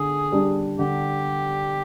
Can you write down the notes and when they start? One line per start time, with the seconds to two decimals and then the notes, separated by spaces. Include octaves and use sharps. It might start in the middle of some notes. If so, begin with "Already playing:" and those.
Already playing: D3 G#4
0.32 G3 D4
0.79 D3 G4